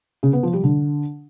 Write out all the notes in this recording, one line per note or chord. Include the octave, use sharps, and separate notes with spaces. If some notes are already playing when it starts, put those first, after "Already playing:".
C#3
B3
F3
G3
D3